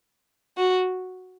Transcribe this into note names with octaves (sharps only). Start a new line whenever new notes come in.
F#4